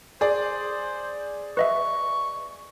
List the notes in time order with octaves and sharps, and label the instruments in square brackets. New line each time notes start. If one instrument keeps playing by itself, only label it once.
[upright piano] G#4 D5 [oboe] C5
[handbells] B4 D#5 E5 [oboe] C#6